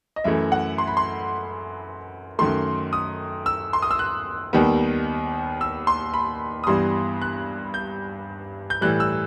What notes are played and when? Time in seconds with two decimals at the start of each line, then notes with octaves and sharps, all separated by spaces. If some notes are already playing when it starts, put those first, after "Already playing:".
0.16 D#5
0.24 F#2 E3 A3 E5
0.52 F#5
0.78 C6
0.88 B5
0.97 C6
2.39 F#2 D#3 A3 C6
2.93 D#6
3.46 E6
3.73 C6
3.82 D#6
3.91 E6
3.99 F#6
4.53 D#2 D#3 G3 B3
5.61 E6
5.87 C6
6.14 B5
6.64 D#6
6.67 G2 E3 G3 B3 C6
7.22 F#6
7.74 G6
8.70 G6
8.81 A2 E3 G3 F#6
9.00 E6